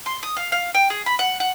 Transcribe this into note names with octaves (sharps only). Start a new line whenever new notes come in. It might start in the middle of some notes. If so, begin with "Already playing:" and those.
C6
D#6
F5
F5
G5
G#4
B5
F#5
F#5